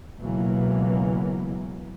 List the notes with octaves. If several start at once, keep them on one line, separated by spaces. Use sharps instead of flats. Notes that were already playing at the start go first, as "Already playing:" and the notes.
C#2 B2 E3 F#3 A#3